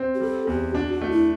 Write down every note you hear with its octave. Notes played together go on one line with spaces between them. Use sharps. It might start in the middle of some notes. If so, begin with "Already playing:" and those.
Already playing: C4
G4
G3 A4
E2 G4
D4 F#4
F#4
A3
E4